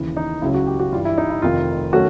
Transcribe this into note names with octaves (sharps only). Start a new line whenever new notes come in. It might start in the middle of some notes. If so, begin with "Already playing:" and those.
Already playing: D#2 C#3 E3
D#4
C#2 C#3 F#3 E4
F#4
G4
F#4
G2 E3 G3 F4
E4
D#4
E4
F1 F2 C3 D#3 F4
D#3 F#3 A3 C#4 F#4